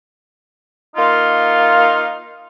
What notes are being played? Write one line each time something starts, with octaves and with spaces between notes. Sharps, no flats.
A#3 D#4 F4